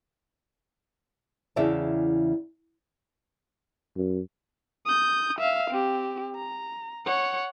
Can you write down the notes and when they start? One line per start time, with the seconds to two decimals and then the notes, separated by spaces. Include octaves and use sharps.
1.56 E2 C#3 E3 D5 E5 A5
3.96 F#2
4.86 D#6 G6
5.39 E5 F5
5.70 C4 G4
6.35 A#5
7.06 C#5 F#5